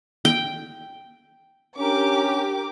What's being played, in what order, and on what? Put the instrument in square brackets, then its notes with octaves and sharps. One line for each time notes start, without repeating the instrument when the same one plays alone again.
[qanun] G5
[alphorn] C#4 [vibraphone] D4 A#5 [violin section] G4 A#4 D6